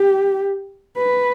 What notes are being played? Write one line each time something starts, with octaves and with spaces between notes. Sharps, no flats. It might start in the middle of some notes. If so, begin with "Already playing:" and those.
Already playing: G4
B4